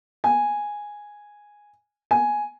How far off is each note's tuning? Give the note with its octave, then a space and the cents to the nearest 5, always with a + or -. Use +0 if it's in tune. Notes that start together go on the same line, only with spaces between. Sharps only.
G#5 -5
G#5 +5